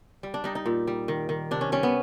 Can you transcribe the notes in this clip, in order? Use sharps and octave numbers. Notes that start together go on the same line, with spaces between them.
G3
D4
G3 D#4
D#4
A#2
G3
D#3
D#3
C3 D4
C#4
G3 C#4
B3